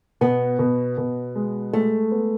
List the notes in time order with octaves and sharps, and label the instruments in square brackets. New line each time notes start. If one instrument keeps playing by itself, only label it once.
[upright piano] B2 [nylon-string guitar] B3
[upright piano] B2
B2
G#3
[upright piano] G#3 [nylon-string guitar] A3
[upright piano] B3